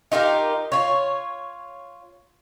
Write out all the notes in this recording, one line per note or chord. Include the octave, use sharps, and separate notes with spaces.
D#4 F4 G4 A#4
F4 C#5